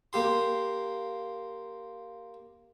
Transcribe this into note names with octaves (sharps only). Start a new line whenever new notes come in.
A#3 G4 C6